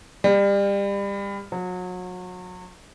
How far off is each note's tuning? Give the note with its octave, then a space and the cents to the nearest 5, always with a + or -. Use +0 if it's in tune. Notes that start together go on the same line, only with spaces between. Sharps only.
G3 +30
F#3 -30